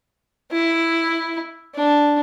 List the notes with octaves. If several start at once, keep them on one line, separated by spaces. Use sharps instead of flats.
E4
D4